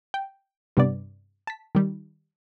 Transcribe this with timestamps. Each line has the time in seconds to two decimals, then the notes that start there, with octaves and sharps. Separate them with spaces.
0.14 G5
0.77 G2 C3 B3 D5
1.47 A5 B6
1.75 D#3 G3